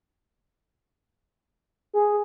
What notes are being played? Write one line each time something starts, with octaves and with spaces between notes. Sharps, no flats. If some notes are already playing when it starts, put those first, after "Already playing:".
G#4